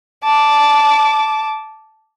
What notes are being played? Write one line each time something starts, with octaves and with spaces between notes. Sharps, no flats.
A5 D6